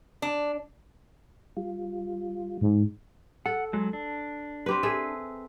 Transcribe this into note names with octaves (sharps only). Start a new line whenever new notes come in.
D4
G3 F4
G#2
A4 F#5
F#3 G#3
D4
C4 G4 B4
G#4 A4 E5